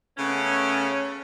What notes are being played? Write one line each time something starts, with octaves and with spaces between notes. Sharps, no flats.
C#3 A3 B3 C#4